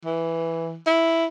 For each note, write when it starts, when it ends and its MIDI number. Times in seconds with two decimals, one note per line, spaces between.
0.05 0.77 52
0.87 1.25 64